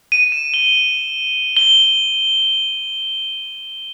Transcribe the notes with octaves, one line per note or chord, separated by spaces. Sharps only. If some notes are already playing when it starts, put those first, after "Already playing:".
D#7
E7
G7
G7